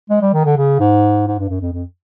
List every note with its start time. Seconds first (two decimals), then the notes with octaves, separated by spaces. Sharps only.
0.10 G#3
0.22 G3
0.34 D#3
0.45 D3
0.56 C#3
0.80 G#2
1.27 G#2
1.39 G2
1.49 F#2
1.61 F2
1.73 F2